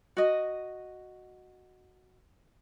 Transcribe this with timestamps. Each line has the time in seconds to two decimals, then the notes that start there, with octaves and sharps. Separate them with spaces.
0.17 F#4 D#5